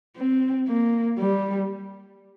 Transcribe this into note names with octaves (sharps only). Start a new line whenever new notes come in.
C4
A#3
G3